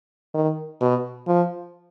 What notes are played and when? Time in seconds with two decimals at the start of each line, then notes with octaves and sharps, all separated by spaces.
0.34 D#3
0.81 B2
1.27 F3